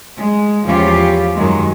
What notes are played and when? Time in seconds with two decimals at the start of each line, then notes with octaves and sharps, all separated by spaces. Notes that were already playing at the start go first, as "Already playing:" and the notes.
0.17 G#3
0.66 E2 F3 C#4 F4 G4
1.36 F#2 D#3 F#3 G#3